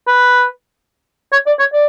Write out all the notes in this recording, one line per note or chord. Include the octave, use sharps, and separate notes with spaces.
B4
C#5
D5
C#5
D5